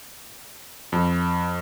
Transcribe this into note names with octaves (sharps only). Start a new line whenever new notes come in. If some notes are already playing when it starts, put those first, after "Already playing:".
F2